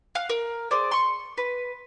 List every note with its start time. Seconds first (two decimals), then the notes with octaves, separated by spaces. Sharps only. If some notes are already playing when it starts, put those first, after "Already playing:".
0.15 F5 F#5
0.29 A#4
0.71 G#4 C5 D5
0.91 C6 C#6
1.38 B4